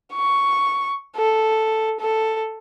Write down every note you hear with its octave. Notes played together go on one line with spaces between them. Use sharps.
C#6
A4
A4